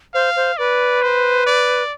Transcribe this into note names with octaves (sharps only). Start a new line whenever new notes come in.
C5 F5
C5
B4 D5
C5
D5